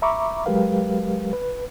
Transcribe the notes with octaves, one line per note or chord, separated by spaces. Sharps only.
E5 A#5 B5 C#6 D6
F#3 G#3 G4 A#4 B4 F5
B4